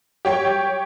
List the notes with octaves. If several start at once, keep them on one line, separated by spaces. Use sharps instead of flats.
G4 C#5 G5